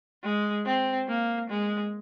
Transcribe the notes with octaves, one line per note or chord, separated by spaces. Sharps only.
G#3
C4
A#3
G#3